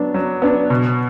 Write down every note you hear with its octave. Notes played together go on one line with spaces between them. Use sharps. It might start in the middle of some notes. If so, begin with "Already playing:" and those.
Already playing: F#3 B3 D4
F#3
B3 D4
B2